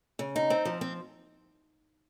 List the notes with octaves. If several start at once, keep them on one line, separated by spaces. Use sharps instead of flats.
C#3
D#4
C4
F3
C4